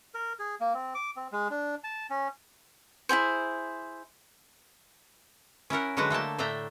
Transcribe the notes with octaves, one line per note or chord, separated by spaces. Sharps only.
A#4
G#4
A#3
C4
D6
C4
G#3
D4
A5
C#4
E4 F4 G#4 C5
C#4 E4 A#4 F#5
D3 F#3 G#3 F#4 B4 F#5
A3 A#3 G5 A5
A2 A3 D4 E5 G5 A#5